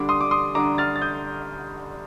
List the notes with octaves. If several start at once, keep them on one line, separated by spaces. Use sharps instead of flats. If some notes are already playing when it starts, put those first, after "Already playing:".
Already playing: D3 G3 D4 D6
C6 D#6
D6
C6 D#6
D3 G3 D4 A#5 D6
F6 A6
A6
D#6 G6